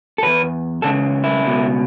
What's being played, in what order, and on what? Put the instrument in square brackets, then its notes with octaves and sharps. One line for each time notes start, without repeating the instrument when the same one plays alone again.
[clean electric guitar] A4
E2 B2 B4
C#2 C#3 E3 A4
E4
C#2 B2